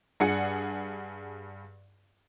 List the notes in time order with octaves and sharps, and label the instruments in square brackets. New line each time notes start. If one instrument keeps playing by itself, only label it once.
[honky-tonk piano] G2 G#4 D5 F#5 C#7